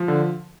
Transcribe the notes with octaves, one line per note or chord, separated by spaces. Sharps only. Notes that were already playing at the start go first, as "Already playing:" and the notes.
Already playing: F3
D3